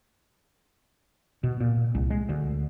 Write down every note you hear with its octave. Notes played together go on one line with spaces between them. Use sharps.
B2
A#2
C2
G#3
D2